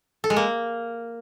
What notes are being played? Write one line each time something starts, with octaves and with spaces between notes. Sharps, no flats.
A4
G#3
A#3